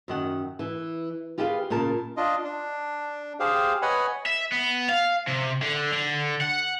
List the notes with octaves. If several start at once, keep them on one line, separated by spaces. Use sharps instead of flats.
F#2 D#3 F#5
E3
F4 G4 G#4 B4 D#5 F5
A#2 C#3 A#4 A5
D4 F4 D#5
D4
G4 G#4 C5 F5
B4 C#5 D#5 F#5 G#5 B5
E5
B3
F5
C3
D3
D3
F#5